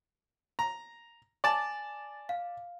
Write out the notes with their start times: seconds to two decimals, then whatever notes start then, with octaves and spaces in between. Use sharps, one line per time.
0.59 A#5
1.44 D5 G#5 A5 A6
2.29 F5